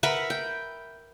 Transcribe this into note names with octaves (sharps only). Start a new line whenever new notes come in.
A#4 B4 E5 F#5
G5